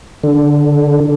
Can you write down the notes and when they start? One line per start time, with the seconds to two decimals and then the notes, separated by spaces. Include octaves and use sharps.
0.23 D3